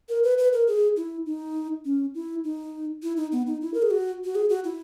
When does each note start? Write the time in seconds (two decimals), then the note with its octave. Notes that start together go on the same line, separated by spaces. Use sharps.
0.09 A#4
0.24 B4
0.38 B4
0.53 A#4
0.68 G#4
0.97 E4
1.26 D#4
1.85 C#4
2.15 E4
2.44 D#4
3.03 E4
3.17 D#4
3.32 B3
3.47 D#4
3.62 E4
3.74 A#4
3.82 G#4
3.91 F#4
4.24 F#4
4.35 G#4
4.49 F#4
4.64 E4